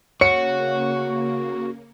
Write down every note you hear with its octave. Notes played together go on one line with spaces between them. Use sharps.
C#3 A#3 F#4 C#5 C#7